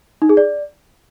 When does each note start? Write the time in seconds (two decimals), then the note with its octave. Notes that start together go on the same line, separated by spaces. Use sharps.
0.22 D#4
0.29 G#4
0.37 D5